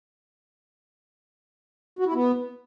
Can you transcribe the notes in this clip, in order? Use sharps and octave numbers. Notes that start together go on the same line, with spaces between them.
F#4
E4
B3